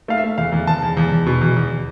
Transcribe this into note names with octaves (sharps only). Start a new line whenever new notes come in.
A3 F5
E5
A3
E2 F5
E2
E2 A5
E2
E2
E2
B2
E2
E2